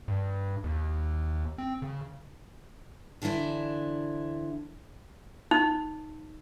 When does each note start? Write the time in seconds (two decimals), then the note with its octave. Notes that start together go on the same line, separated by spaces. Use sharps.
0.08 G2
0.64 D#2
1.58 C4
1.82 C#3
3.22 D3 E3 D4 E4 C5
5.51 D#4